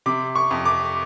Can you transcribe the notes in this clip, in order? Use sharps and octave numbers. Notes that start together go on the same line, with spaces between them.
C3 D6
C#6
F2
D6